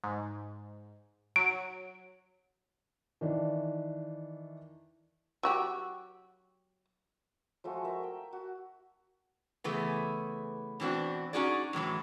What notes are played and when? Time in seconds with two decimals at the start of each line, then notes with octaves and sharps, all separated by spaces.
0.04 G#2
1.36 F#3 D7
3.21 D#3 E3 D4
5.43 F#3 F#4 G4
7.64 F3 G#3 A3 F#4
7.84 A#4 E5
8.03 G5
8.33 F#4
9.64 C#3 E3 A3 B3 G#4
10.80 B2 E3 C4 D4 F#4
11.33 C#4 D#4 F#4 G#4 D5
11.73 F#2 A2 E3 F#3